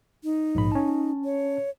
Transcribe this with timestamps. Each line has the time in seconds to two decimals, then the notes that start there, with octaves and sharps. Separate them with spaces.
0.24 D#4
0.55 A#1 G#2 B5
0.72 C#4 A5
1.24 C#5